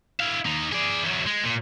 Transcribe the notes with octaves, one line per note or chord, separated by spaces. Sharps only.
E4 F5
D#2 D#4
G#4 D5
E2 F#3
G#3
A#2